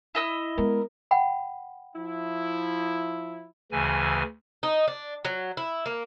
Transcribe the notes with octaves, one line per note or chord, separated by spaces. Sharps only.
E4 D#5 E6
G#3 B3 A#4
F#5 G5 B5
F3 E4
D2 C#3 E3 G#5
D#4
D4
F#3
E4
A#3